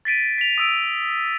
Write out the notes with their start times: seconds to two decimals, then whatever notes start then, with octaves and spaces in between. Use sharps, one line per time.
0.05 A6 B6 D7 D#7
0.38 B6 F7
0.58 D#6 E6 D7